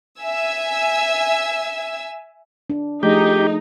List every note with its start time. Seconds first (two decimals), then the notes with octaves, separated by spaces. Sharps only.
0.21 E5 G#5 E6
2.70 D4
3.03 F3 A3 D#4 G4 G#4